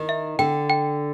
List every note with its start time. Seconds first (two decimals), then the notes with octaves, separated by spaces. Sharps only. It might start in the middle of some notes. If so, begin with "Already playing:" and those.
Already playing: D#3
0.09 E5
0.39 D3 G5
0.70 G5